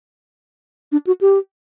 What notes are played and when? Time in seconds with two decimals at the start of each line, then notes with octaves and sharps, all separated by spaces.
0.92 D4
1.07 F#4
1.21 G4